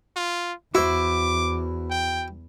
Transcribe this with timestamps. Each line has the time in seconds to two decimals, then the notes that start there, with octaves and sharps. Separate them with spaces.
0.16 F4
0.75 E2 E4 F#4 C5 D6
1.90 G5